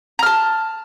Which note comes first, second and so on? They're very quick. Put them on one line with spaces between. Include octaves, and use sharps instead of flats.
A#5 F6 A5